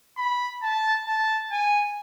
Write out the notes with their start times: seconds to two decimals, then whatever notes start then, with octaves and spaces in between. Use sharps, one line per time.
0.17 B5
0.63 A5
1.07 A5
1.52 G#5